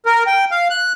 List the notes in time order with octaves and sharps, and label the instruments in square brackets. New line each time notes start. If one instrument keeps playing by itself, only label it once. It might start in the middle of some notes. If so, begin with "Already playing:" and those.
[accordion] A#4
G5
F5
F#6